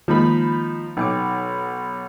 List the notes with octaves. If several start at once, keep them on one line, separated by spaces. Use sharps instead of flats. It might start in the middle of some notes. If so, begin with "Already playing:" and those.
D#3 F3 G#3 A#3 D#4 B5
B1 D#4 G5 D6